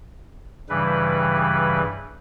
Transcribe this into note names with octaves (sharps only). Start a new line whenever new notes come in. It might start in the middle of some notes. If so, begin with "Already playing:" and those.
G2 C#3 E3 G3 B4